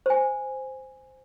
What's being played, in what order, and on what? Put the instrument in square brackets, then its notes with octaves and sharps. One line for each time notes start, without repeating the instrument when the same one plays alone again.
[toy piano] C5 G#5